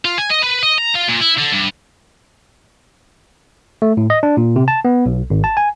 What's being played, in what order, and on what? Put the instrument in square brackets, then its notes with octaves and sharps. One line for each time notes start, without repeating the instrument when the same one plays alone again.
[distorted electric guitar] F4
G#5
D#5
B4
D#5
A#5
F4
A#2
E4
D3
G2
[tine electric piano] A3
A2
D#5
D4
A#2
C3
A5
B3
B1
G#1
A5
G#5